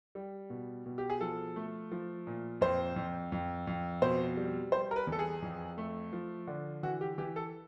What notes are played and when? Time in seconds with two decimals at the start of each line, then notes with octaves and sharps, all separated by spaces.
0.15 G3
0.50 B2
0.86 B2
0.98 G4
1.10 G#4
1.21 F3 A4
1.56 A3
1.91 F3
2.27 A#2
2.61 F2 C5
2.96 F2
3.32 F2
3.67 F2
4.02 B2 C5
4.37 G3
4.72 G3 C5
4.91 A#4
4.96 B4
5.07 E2
5.12 A4
5.19 G#4
5.42 F2
5.78 A3
6.13 F3
6.47 D3
6.83 E3 F#4
7.01 G4
7.18 E3 G4
7.36 A4